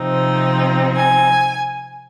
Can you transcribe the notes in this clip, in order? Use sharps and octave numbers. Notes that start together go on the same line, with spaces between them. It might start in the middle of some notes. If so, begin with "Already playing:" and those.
Already playing: C3 F3 C4 D#4
G#5